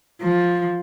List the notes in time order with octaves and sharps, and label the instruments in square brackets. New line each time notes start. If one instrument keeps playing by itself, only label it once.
[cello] F3